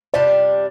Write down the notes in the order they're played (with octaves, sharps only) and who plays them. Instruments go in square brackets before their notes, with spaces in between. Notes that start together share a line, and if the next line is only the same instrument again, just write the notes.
[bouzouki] C3 G3 D4 F4 [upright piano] D5